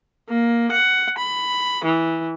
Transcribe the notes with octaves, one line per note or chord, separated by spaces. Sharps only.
A#3
F#5
B5
E3